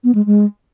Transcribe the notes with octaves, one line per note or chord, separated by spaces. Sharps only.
B3
G#3
G#3